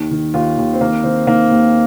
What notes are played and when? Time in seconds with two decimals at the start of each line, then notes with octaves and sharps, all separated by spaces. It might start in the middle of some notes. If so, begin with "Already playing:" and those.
Already playing: D#2 D#3
0.11 D#3
0.34 D#2 F4
0.57 D#2
0.73 C4
0.81 D#3 A#3
1.04 D#3 C4
1.27 D#3 A#3
1.51 D#2